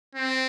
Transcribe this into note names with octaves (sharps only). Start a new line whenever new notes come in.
C4